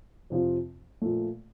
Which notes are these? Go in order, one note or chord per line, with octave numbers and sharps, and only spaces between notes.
F2 C3 F3 C4 F4
A#2 F3 A3